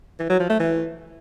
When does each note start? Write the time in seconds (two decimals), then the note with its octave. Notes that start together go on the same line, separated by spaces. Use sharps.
0.19 E3
0.30 F#3
0.40 F3
0.50 A3
0.60 E3